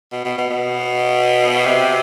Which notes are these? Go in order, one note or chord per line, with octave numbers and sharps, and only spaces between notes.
B2
B2
B2
B2
C3